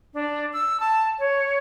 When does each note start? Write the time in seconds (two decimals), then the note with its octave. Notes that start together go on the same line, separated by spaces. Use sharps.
0.14 D4
0.53 E6
0.80 A5
1.19 C#5